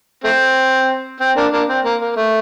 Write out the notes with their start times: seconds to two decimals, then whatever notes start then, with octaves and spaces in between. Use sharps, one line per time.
0.24 A3 C4
1.20 C4
1.36 A#3 D4
1.52 A#3 D4
1.68 C4
1.85 A#3
2.01 A#3
2.16 A3